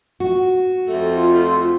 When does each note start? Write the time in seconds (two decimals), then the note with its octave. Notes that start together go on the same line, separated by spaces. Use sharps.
0.20 F#4
0.87 F2 A3
1.14 F4